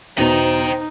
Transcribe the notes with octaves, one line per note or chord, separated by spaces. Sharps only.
E2 B2 D#4 C5 D#5 G5